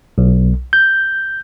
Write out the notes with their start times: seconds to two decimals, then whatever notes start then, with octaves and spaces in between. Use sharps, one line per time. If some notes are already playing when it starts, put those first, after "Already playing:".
0.18 B1
0.73 G6